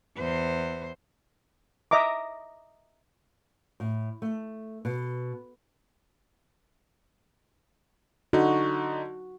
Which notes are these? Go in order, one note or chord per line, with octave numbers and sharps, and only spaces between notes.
E2 C5
D#5 E5 A#5 D6
A2
A3
B2
D3 D#4 F#4